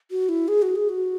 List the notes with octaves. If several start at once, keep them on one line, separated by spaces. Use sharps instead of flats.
F#4
E4
G#4
F#4
G#4
F#4